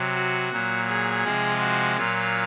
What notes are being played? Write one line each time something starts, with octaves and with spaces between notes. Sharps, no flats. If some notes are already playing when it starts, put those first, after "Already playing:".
Already playing: C3 F#3
F#4
A#2 F#3
G#4
C3 F3 G#3
F#4
A#2 F#3 F4